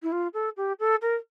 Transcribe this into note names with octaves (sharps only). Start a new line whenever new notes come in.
E4
F4
A4
G4
A4
A#4